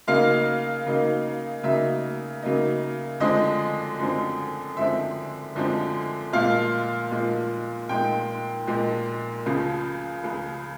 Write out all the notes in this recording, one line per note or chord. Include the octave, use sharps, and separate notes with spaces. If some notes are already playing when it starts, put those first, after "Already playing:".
C#3 F#3 A#3 D#4 F5
C#3 F#3 A#3 D#4
C#3 F#3 A#3 D#4 E5
C#3 F#3 A#3 D#4
F#2 D3 F3 G#3 C4 D#5
F#2 D3 F3 G#3 C4
F#2 D3 F3 G#3 C4 E5
F#2 D3 F3 G#3 C4
A#2 F3 G#3 F5
A#2 F3 G#3
A#2 F3 G#3 G5
A#2 F3 G#3
C#2 C#3 F3
C#2 C#3 F3